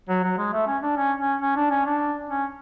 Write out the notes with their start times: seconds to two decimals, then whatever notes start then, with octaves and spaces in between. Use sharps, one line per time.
0.09 F#3
0.24 F#3
0.38 G#3
0.53 A3
0.67 C#4
0.83 D4
0.97 C#4
1.19 C#4
1.41 C#4
1.56 D4
1.71 C#4
1.85 D4
2.29 C#4